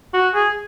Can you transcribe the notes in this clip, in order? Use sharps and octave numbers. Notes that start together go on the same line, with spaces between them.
F#4
G#4